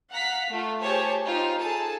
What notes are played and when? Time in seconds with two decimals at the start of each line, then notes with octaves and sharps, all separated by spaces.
0.12 F5 F#5 A#5 B6
0.49 A3 F4
0.81 G4 G#4 C5 C#5 A5
1.23 D#4 F4 G4 C5
1.56 G#4 A4 A5